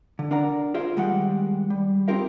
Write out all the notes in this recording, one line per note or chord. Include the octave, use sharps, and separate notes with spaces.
D3
D4 A#4 D5 F#5 A#5
F4 G#4 A#4 C5 E5 F5
D#3 G3 G#3 G4 F#5
G3
C4 D#4 F4 G4 A#4 E5